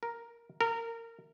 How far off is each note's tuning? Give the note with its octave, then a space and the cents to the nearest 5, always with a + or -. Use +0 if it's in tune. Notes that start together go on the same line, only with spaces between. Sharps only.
A#4 +5
A#4 -20